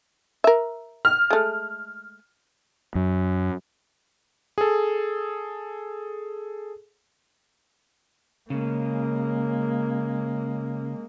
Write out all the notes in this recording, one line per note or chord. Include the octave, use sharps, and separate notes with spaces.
A#4 E5
F6
G#3 A3
F#2
G#4 A4
C#3 G#3 A#3